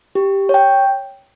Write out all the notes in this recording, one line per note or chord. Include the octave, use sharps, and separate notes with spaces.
G4
C#5 G5